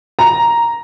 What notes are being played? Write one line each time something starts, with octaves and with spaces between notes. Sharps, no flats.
A#5